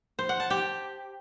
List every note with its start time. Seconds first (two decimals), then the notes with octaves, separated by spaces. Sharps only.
0.19 C5
0.29 F#5
0.40 A5
0.50 G4